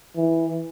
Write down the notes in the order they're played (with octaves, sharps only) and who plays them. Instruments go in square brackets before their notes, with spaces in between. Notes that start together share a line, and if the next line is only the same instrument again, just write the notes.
[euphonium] E3